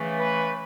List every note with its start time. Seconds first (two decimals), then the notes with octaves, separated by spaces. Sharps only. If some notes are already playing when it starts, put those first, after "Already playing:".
Already playing: C#3 E3 A3
0.17 B4